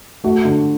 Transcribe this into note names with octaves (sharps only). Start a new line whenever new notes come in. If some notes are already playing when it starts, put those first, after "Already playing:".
A3 F#4
D3